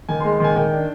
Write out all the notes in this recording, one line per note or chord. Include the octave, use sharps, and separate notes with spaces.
D#3 G#5
C6
G#3
C6
D#3 G#5
D#3 G5
D4